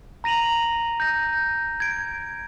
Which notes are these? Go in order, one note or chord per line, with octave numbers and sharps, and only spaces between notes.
A#5 A#6 D#7 F7 F#7
G6 A#6
G#6 D7